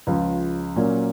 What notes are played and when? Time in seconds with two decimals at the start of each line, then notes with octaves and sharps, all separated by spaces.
0.07 C#2 C#3 F3
0.76 A#2 F#3 A#3 C#4